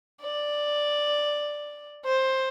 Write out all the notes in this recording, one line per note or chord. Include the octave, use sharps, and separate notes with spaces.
D5
C5